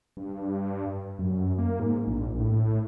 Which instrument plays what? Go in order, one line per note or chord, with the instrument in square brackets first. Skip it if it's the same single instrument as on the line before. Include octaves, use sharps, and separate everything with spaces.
[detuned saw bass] G2
F#2
A#3
G#2
A#1
A2